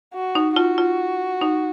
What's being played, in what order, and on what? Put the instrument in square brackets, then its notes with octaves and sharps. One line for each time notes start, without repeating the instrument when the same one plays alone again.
[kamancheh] F#4
[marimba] D#4
[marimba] F4 [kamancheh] F#4
[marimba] F4
D#4